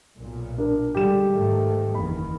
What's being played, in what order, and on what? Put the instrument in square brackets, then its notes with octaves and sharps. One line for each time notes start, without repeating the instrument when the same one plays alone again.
[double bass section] B1 A#2
[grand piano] D4 A#4
[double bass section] D3 G3 G#3 [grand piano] G4 E7
[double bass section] G#2 D#3 A3
[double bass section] F#1 E2 D#3 [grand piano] B5